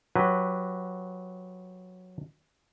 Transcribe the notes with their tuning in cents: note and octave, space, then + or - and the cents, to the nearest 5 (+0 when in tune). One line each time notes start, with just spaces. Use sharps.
F#3 -15 G4 +0 B4 +0